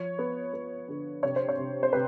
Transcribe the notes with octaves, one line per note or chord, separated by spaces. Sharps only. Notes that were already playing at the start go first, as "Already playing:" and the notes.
Already playing: F3 C#5
B3
B3
D3
C3 C#5
C5
C#5
C3
C5
C3 B4